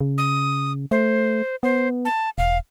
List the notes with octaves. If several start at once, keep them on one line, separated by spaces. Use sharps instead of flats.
C#3
D#6
A3 C5
B3 C5
A5
E1 F5